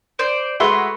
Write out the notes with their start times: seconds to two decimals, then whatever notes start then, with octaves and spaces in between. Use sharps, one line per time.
0.19 C5 D5
0.60 G#3 A3 F#4 B4 E5 C6